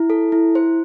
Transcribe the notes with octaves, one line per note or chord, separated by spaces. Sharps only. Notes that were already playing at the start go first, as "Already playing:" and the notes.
Already playing: E4
A4
E4
C5